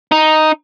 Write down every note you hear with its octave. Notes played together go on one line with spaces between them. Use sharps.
D#4